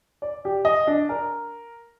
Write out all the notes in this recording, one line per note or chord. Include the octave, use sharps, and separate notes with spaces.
D5
G4
D#5
D4
A#4